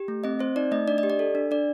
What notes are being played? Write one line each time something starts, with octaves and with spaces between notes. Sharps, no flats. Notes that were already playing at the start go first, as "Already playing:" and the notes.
Already playing: G4
A3
C4 D#5
C4 C5
D#4 D5
A3 D#5
D4 D5
D#5
G4
D5
A4
D4
D4 D5